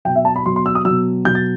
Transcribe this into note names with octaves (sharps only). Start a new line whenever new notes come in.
B2 F#3 G5
E5
A5
B5
B2 F#3 C6
C6
E6
D#6
B2 F#3 E6
B2 F#3 G6
A6